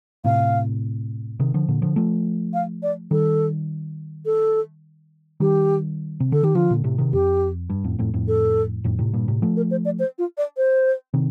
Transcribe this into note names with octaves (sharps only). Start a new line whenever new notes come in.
A2 C3 F5
C3 D#3
D3 F3
A#2 D3
D3 F3
F3 A3
F5
D5
D#3 G3 A4
A4
D#3 G3 G4
C3
D3 A4
D#3 G4
D3 F3 F4
A#2 D3
A2 C3
C3 D#3
F2 G4
G2
F2 A2
F2 A2
F2 A2
A4
F2 A2
A2 C3
G2 A#2
A2 C3
F3 A3
A#4
C5
D5
C5
F4
D5
C5
C3 D#3